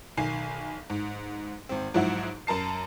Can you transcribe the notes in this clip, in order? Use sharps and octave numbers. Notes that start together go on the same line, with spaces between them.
B1 D#3 G#5 C7
G#2
G#1 C4
G#2 F3 F#3 E4 F#4
F#2 A#4 A5 C7